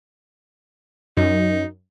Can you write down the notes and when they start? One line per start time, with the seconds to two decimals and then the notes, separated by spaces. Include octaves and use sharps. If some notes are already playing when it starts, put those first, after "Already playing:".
1.17 F#2 D#4